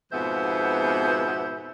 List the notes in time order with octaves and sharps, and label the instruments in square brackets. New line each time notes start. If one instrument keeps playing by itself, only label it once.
[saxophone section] F2 G#2 B2 B3 C5 E5